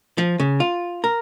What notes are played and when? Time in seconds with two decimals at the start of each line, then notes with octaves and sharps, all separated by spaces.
0.18 F3
0.40 C#3
0.60 F4
1.04 A#4